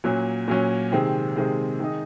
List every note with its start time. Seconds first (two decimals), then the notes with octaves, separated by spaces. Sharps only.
0.04 A#2 F#3 C#4
0.48 A#2 F#3 C#4
0.92 C3 D#3 G#3 C4
1.36 C3 D#3 G#3 C4
1.80 D#3 G#3 D#4